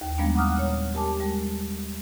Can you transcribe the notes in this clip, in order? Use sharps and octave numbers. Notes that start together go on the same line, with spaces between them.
D#2
F3 G3 G#3 A#3 B3 D4
F#5 A#5 D6 D#6 F6 F#6
A#2 C#5
G4 A#4 G#5 A5 D6
G3 G#3